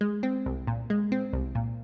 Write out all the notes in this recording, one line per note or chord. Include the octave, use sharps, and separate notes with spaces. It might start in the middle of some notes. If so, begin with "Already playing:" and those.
G#3
C4
C2
A#2
G#3
C4
C2
A#2